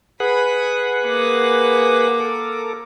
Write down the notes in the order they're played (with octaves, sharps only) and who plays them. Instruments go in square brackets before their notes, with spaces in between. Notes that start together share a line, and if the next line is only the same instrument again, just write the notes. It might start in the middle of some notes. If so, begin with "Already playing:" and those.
[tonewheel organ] G#4 B4 F#5 [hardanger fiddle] B5
[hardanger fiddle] A#3 D6
[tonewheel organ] A4 A#4